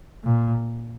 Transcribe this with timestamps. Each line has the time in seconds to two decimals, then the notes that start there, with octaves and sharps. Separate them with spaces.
0.24 A#2